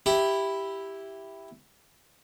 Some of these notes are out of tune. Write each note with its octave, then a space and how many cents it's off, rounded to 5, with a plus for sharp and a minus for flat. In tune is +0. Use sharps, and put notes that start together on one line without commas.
E4 +0 G4 +0